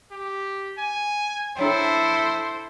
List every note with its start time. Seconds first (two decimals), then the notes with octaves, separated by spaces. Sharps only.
0.11 G4
0.78 G#5
1.57 D4 E4 A4 C5 C#5 G5